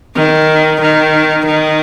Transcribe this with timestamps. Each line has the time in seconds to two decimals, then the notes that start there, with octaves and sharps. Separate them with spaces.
0.15 D#3
0.81 D#3
1.46 D#3